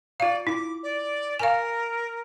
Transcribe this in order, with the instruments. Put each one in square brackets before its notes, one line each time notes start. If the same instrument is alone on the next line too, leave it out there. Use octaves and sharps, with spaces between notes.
[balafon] F4 F5 [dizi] D5
[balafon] E4 [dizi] D6
[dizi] D5
[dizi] A#4 [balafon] F5 G#5